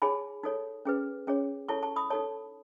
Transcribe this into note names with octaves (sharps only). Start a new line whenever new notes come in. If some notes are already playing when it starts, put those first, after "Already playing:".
D#4 G#4 C#5 G#5 B5
D#4 A4 C#5
C#4 G#4 B4
C#4 G#4 C#5
E4 A4 C#5 A5 C#6
A5 C#6
B5 D#6
D#4 A4 C#5 A5 C#6